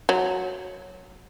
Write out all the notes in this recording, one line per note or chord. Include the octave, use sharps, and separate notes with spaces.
F#3